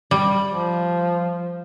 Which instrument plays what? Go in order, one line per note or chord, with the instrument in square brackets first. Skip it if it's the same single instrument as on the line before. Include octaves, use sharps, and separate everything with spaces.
[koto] G3
[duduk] F3